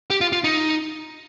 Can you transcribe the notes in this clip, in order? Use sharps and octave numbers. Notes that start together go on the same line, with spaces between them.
G4
F4
F4
D#4